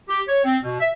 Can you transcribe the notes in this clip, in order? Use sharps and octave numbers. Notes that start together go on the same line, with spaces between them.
G4
C#5
C4
B2
E5